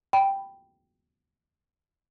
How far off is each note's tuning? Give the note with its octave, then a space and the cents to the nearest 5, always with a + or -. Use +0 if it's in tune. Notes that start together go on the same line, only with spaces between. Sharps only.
G5 +0 B5 +0